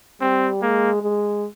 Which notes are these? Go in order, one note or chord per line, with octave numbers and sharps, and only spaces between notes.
G3 C4
G#3 A#3
G#3